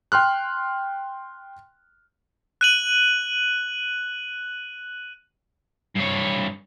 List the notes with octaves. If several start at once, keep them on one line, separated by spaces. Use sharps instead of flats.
G5 C6 F6 F#6
F#6 D#7 F#7
G2 C#5